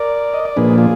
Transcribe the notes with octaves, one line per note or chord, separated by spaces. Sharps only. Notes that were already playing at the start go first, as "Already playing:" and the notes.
Already playing: A#4 D5
D#5
D5
A#2 F3 A#3 D4 G#4 B4
F4 G#4